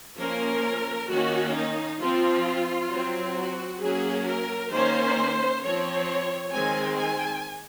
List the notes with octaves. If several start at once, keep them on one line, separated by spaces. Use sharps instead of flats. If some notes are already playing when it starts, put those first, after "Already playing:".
F3 A#3 C#4 A#4
D#3 A#3 C#4 F#4
D#4
F3 C4 F4
F#3 C4
F#4
F#3 A#3 C#4 G#4
A#4
D#3 A#3 C#4 C5
F3 C4 C#5
D#3 G#3 C4 G#5
G#5